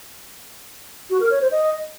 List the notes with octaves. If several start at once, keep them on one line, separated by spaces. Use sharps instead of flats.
F#4
A#4
C#5
C5
D#5